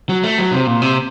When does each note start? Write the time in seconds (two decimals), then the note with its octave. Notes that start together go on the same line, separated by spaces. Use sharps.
0.09 F#3
0.23 A3
0.38 F#3
0.52 C3
0.67 A#2
0.82 C3